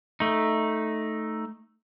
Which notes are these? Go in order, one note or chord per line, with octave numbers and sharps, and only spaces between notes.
A3 D#4